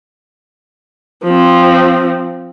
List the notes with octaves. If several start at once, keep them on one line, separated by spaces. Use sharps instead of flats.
F3 C4